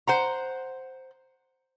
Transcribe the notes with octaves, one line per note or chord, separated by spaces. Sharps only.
C5 F#5 A#5